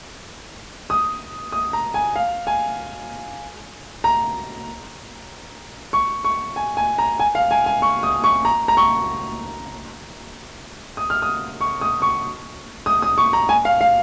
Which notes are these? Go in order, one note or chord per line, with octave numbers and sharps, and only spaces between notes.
D#6
D#6
A#5
G#5
F5
G#5
A#5
C#6
C#6
G#5
G#5
A#5
G#5
F5
G#5
G#5
C#6
D#6
C#6
A#5
A#5
C#6
D#6
F6
D#6
C#6
D#6
C#6
D#6
D#6
C#6
A#5
G#5
F5
F5